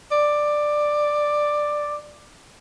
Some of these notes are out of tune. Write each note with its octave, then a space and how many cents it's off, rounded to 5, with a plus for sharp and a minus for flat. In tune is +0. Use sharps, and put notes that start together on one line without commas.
D5 +10